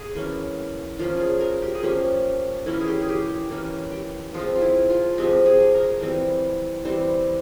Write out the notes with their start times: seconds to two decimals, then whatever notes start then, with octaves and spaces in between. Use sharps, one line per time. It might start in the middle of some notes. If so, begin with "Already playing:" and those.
Already playing: G#4
0.15 E3 A#3 C#4
0.99 F3 A#3 C#4 F4
1.20 G#4
1.41 A#4
1.62 G4
1.75 G#4
1.83 F3 A#3 C#4 G4
2.66 E3 A#3 C#4 E4
2.80 G#4
2.87 G4
3.02 G#4
3.09 G4
3.29 G4
3.51 E3 A#3 C#4
3.92 G4
4.34 F3 G#3 C4 F4
4.55 F4
4.61 E4
4.90 F4
5.18 F3 G#3 C4 G4
5.46 G#4
5.74 A#4
6.01 E3 G3 C4
6.85 E3 G3 C4 C5